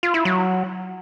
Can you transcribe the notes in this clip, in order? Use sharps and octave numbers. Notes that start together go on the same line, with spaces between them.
F4
E4
F#3